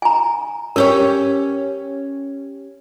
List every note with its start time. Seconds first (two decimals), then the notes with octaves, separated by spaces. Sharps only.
0.02 G#5 A#5
0.76 C#4 G4 A#4 C#5